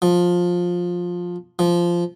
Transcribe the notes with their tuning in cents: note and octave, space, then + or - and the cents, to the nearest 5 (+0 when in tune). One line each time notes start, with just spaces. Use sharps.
F3 +15
F3 -10